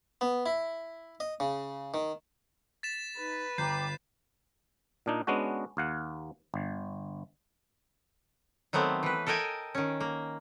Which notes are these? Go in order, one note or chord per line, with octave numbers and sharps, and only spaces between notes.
B3
E4
D#5
C#3
D#3
A6 B6 E7
D#4 B4
G1 G5 A#5 D6 G6 C7
A#2 D4 D#4
G#3 B3 C#4 D4 F#4
D#2 F5 F#5
G1
D#3 F#3 A3 B3 C4
E3 B4
A4 A#4 D#5 G5 G#5
D#3 C#4
A#3